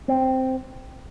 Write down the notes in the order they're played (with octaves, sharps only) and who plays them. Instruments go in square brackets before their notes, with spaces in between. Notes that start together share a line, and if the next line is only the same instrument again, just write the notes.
[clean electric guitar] C4